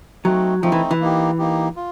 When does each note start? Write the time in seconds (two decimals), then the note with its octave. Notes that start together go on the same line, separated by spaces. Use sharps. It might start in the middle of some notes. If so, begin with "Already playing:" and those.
0.24 F#3 A3 C4 D#4
0.62 F3 A3 C4 D#4
0.72 E3
0.91 E3
1.01 A#3 D#4 G4
1.39 A#3 D#4 G4
1.76 F4